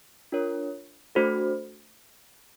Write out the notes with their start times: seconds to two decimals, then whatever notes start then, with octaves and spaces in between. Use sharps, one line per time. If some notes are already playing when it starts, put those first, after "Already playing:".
0.32 D4 F4 A#4 C#5
1.15 A3 D4 F#4 A4 C5